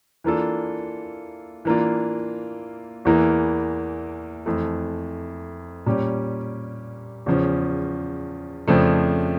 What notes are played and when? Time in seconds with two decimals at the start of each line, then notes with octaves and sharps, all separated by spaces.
0.24 E3 A#3 D4 F4 A4
1.65 E3 A#3 D4 F4
3.05 E2 E3 A#3 E4 A#4
4.46 F2 E3 A3
5.86 A#2 G3 C#4 G4
7.26 E2 C#3 F3 C#4
8.67 F2 C#3 F3 A3 D4